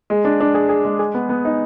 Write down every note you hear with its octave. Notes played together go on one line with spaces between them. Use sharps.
G#3
D4
D4
G#4
G#4
G#3
G#4
B3
B3
D#4